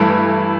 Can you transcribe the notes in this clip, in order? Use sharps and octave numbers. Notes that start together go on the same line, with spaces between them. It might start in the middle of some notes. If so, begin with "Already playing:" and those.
Already playing: G2 E3 A3 E4